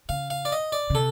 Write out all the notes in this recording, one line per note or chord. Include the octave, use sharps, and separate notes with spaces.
C#3 F5
F5
D5
D#5
D5
C#3
C3 A4